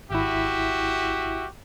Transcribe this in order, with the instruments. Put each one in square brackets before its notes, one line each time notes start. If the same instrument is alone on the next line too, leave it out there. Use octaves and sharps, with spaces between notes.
[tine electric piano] G#1 E4 [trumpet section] F#4 G4 E5